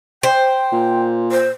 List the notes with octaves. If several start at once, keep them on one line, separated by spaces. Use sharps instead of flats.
C5 G5
A#2
C5